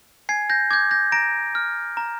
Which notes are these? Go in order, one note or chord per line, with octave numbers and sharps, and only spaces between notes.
G#5 G#6 C7
G6 A#6
D6 G6 G#6
G6 A#6
A#5 A#6 D7
F6
A#5